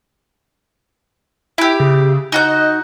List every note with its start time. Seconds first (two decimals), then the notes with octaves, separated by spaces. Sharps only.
1.58 E4 G4 E5
1.80 C#3
2.32 D#4 F#4 D#5 G6